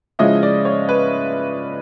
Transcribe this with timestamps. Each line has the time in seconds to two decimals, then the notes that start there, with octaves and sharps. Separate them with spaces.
0.19 C#3 F3 G#3 C#4 E4 D#5
0.43 D5
0.65 C#5
0.89 B4